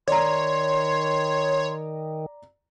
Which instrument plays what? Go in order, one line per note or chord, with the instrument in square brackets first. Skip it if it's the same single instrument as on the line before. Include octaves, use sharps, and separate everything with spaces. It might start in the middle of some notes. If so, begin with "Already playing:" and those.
[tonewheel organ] D#3 [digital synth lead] C#5 [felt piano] D5 A#5 [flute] C6